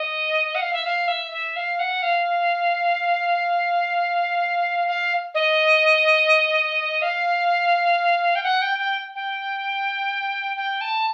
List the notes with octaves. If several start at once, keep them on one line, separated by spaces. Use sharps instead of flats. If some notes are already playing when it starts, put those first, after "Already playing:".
Already playing: D#5
F#5
F5
E5
F5
E5
E5
F5
F#5
F5
F5
D#5
F5
G5
F#5
G5
G5
G5
G5
A5